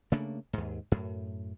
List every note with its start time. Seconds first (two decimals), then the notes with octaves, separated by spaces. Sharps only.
0.12 C#3 A3 A#3 D4
0.53 D#2 G#2
0.92 F#2 A2